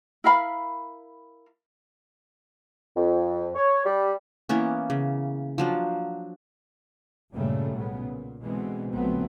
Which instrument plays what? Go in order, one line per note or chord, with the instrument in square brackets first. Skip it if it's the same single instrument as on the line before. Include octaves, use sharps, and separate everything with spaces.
[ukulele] E4 A#4 F5 B5
[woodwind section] F2
C#5
G3
[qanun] E3 A#3 B3 C#4
C#3
F3 F#3 D4
[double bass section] G2 A#2 C#3 F#3 G3 A3
B1 A2 C#3 B3
A#2
B2 D3 E3 G#3 B3 C4
A#1 D3 F#3 A3 B3 C4